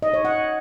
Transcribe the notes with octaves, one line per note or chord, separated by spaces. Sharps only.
D#5
C#5
F#5